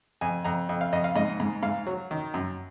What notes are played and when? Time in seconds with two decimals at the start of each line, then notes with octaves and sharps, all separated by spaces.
0.21 F2 G#5
0.44 F2 A#5
0.69 F2
0.81 F5
0.93 F2 D#5
1.04 F5
1.16 G#2 D#5
1.40 G#2
1.63 G#2 F5
1.87 F#3
2.11 D#3
2.34 F#2